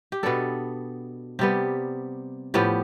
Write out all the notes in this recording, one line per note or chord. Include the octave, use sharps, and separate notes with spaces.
G4
B2 B3 D4 A4
C3 G3 B3 G4
A2 F3 B3 G4